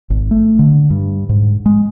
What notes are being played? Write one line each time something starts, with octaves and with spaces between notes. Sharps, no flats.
G#1
A3
D3
G2
G#2
G#3